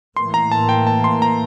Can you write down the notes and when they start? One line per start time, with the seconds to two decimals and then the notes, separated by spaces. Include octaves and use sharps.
0.17 A2 E3 A#3 C6
0.34 A#5
0.52 A5
0.69 G5
0.87 A5
1.04 C6
1.22 A#5